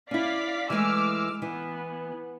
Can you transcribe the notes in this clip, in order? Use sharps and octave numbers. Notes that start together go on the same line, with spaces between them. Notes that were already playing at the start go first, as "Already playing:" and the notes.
C#4 E4 D5 F5 B6
E3 G#3 A3 D6 E6 F6
E3 B3